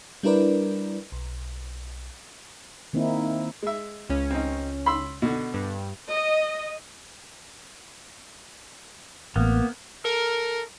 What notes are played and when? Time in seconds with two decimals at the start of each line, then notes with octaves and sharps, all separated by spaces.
0.23 G3 D4 E4 A#4 B4 D5
1.12 B1
2.93 D#3 A#3 C4 D#4 E4
3.62 G#3 E5
4.09 C#2 C#4
4.31 C4 D#4
4.86 B5 C6 E6
5.22 B2 D3
5.54 G2
6.09 D#5
9.36 A1 A#3 B3
10.05 A4 A#4